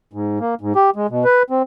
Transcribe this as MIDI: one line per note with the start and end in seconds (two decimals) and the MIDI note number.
0.13 0.39 44
0.40 0.55 58
0.61 0.73 44
0.76 0.90 67
0.96 1.07 56
1.10 1.24 47
1.25 1.43 71
1.50 1.62 60